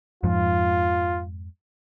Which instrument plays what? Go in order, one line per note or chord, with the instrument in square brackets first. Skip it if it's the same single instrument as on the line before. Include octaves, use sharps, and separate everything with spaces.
[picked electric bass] F2 G#2 F3 [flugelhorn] F4